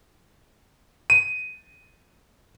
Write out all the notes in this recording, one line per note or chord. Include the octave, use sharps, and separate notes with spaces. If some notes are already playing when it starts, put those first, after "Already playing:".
D#7